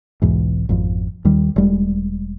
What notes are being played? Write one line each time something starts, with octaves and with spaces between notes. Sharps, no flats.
B1 E2 G#2
G#1 F2
D#2 D#3 G3
E1 G3 G#3